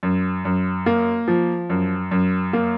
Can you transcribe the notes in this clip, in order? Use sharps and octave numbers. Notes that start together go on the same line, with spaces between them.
F#2
F#2
A#3
F3
F#2
F#2
A#3